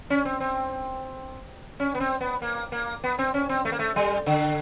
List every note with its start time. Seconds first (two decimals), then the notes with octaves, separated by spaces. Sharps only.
0.10 C#4
0.25 C4
0.40 C4
1.80 C#4
1.95 B3
2.00 C4
2.21 B3
2.42 A#3
2.72 A#3
3.04 B3
3.18 C4
3.34 C#4
3.49 C4
3.65 A3
3.72 A#3
3.79 A3
3.96 G3
4.26 D3